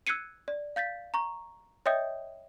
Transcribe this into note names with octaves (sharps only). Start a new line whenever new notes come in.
E6 F#6 G#6 C7 C#7 D#7
D5
F5 G6 A6 B6
A#5 C#6
C#5 D#5 E5 G5 D#6 G6